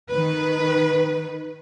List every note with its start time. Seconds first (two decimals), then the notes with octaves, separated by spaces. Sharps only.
0.10 D#3 B4